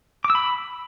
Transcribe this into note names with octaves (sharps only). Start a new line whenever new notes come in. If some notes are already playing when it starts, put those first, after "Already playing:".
D6
E6
B5